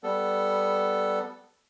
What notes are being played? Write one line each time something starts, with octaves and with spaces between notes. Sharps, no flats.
G3 B3 A4